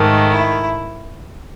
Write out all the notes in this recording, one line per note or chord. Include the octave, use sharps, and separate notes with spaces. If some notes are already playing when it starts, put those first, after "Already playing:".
Already playing: G#2 D#3 A3
E4